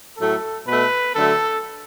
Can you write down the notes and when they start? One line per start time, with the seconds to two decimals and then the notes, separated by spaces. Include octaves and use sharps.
0.18 A2 F#3 A3 A4
0.67 B2 A3 B4
1.15 D3 F#3 A3 A4